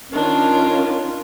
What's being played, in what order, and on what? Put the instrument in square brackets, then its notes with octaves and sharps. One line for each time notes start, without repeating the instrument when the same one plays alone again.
[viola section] D#3 C#4 F4 [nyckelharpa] D4